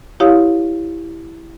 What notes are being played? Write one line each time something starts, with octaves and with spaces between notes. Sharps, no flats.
E4 G4 C#5 F5 D#6